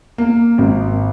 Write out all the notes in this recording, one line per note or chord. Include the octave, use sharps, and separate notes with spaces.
A#3
G#1